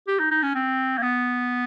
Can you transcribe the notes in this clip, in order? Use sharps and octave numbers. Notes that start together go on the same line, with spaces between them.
G4
D#4
D#4
C#4
C4
A#3
B3